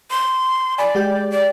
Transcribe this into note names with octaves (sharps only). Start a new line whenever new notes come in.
C6
D5 G#5 B5
G#3 G4 G5
D5